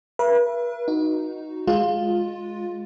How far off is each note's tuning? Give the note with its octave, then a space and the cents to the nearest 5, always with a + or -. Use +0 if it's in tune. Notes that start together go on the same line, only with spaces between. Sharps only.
B4 -40 E5 +40
D#4 +0 F#4 -5
G#3 +0 F4 +10